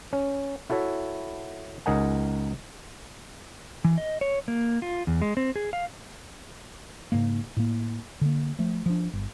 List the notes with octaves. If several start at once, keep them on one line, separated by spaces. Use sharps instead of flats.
C#4
E4 F#4 A4 C#5 E5
C#2 D#4 A#4 D#5 F#5 G#5
E3
D#5
C#5
A#3
F4
E2
G#3
C4
G#4
F5
G#2 C#3 A#3
A2 A#3
D3 A#3
F3 A3
F3 D4
G1